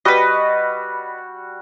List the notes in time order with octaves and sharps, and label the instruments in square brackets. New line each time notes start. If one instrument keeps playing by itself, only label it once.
[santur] G3 F#4 [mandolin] B4 D#5